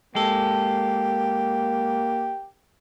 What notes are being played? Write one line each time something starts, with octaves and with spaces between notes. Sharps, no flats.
G#3 A#3 G4 A4